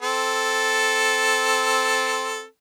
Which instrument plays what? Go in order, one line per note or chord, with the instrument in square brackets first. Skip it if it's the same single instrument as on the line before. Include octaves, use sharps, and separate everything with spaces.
[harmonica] C4 A4